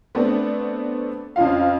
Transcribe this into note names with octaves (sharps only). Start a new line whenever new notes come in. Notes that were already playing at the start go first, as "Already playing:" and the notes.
A3 B3 C4 D4
F2 C#4 F4 F5